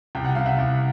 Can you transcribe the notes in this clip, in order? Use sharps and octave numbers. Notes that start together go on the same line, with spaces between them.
C2 G5
F#5
C2 F5
E5 F#5
C2